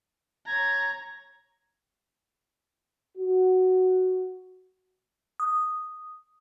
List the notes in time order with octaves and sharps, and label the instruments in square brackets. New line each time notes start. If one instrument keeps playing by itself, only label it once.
[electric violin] C#5 A#5 [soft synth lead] G#6
[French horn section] F#4
[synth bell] D#6